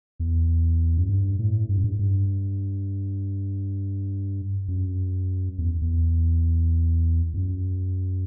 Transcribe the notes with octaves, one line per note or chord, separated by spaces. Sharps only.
E2
F#2
G2
A2
G2
F#2
G2
G2
F#2
E2
E2
E2
F#2